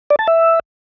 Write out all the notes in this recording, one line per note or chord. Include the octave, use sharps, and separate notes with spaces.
D5
A5
E5